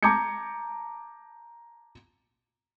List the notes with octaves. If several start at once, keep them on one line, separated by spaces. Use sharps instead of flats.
A5 A#5 D6 G6 G#6 C#7